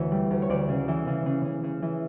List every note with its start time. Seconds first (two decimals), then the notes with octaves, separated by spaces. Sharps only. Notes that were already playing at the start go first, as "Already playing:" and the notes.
Already playing: D2 E3 C#5
0.12 G3
0.31 D2
0.42 C#5
0.50 D2 D5
0.69 C#3
0.88 E3
1.07 C#3
1.26 C#3
1.45 C#3
1.64 C#3
1.82 E3